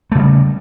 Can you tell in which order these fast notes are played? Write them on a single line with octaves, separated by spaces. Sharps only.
A3 C#3 G3